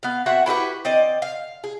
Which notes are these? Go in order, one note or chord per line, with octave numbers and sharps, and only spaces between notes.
B3 F5
C4 F#4 E5 F#5
E4 F#4 G4 B4
C4 D5 D#5
F5
G#4